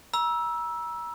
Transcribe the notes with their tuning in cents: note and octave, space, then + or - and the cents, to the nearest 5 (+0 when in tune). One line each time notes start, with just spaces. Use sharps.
A#5 +40 E6 +0